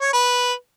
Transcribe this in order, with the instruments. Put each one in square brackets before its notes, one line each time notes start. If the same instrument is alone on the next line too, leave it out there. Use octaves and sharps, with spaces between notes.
[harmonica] C#5
B4